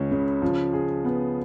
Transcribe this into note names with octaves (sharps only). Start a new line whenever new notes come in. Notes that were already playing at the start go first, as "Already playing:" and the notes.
Already playing: C#2 C#4
C#3
F3
G#4
B3